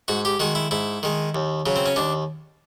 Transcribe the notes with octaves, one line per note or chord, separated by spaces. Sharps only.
G#2 F#4
G4
D#3 G#3 F#4
E4
G#2 E4
D#3 G#3
D#2
C#3 F#3
C4
C#4
D#2 D4